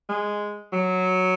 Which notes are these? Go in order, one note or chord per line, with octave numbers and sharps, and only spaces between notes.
G#3
F#3